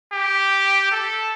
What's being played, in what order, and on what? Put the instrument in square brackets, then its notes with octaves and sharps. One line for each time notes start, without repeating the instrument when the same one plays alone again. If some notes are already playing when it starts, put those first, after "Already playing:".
[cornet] G4
A4